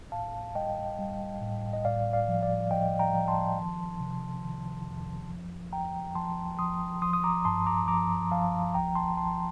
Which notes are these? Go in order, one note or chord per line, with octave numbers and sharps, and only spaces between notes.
A2 F5 A5
G3 D#5 G5
G3
A2
D#5
A2 D5 F5
D5 F5
F3
D5 F5
F3 D#5 G5
G5 A#5
F3
A5 C6
D#3
C3
D#3
F2
F3
F3 G5 A#5
F3 A5 C6
F3 C6 D#6
F3 C6 D#6
D#6
A#5 D6
G2 A5 C6
A#5 D6
F3 A#5 D6
F3 F5 A5
C2 G5 A#5
A5 C6
C2 A5 C6